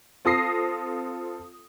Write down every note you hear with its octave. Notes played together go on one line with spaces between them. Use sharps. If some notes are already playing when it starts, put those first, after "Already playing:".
C4 F4 A4 D#6 A#6 C7